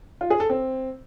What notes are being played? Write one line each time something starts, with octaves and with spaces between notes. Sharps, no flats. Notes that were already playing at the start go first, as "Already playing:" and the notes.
F4
G#4
A4
C4